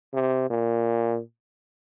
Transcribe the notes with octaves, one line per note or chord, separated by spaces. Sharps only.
C3
A#2